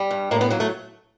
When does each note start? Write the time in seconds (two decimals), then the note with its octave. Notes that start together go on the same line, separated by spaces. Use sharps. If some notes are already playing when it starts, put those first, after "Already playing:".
Already playing: G3
0.11 G2
0.31 A2 A#3
0.41 B3
0.50 F#3 A#3
0.60 A3